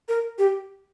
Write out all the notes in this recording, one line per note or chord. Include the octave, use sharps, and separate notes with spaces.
A#4
G4